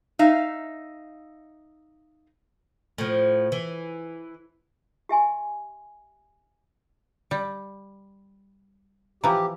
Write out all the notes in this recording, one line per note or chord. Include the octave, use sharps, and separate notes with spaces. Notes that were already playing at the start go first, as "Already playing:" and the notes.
D#4 E5 F5
A2 F3
E3
G4 E5 G#5 C6
G3
E3 F3 G4 A#5